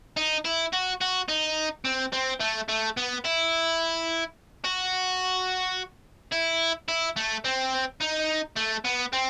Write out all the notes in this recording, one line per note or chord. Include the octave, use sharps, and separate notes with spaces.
D#4
E4
F#4
F#4
D#4
C4
C4
A3
A3
B3
E4
F#4
E4
E4
A3
C4
D#4
A3
B3
C4